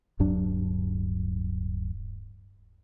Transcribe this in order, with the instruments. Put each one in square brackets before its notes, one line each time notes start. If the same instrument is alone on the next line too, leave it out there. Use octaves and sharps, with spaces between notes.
[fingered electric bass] D1 G2 F#3 D4